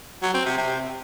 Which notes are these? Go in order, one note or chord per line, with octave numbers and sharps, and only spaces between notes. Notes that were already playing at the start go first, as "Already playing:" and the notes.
F#3
C4
C3
C3